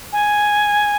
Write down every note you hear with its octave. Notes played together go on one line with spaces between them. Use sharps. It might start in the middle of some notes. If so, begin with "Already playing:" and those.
G#5